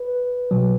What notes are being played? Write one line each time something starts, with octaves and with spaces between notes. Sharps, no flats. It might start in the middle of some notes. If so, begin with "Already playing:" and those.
Already playing: B4
B2 F#3